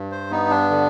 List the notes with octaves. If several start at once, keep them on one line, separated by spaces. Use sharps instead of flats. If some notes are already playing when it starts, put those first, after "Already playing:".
Already playing: G2
C5
B3 D#4
D4
D3